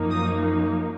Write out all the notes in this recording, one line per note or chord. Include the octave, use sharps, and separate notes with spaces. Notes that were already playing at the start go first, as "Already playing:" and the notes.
Already playing: F#2 F3 A#3 D#4
D#6